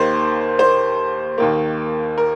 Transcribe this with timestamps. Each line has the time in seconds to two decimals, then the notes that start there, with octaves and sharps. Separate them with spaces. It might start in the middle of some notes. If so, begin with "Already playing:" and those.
Already playing: D#2 D#3 A#3 C5
0.59 C5
1.38 D#2 D#3 A#3
2.18 A#4